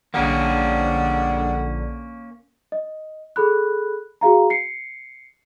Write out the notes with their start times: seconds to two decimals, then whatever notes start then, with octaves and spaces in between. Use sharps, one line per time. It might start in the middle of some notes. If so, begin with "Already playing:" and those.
0.14 A#1 D3 G3 G#3 A#3 C#4 D4 F#5
2.72 D#5
3.36 G#4 A4 B5 F#6
4.21 F#4 G#4 F5 A#5
4.50 C7 C#7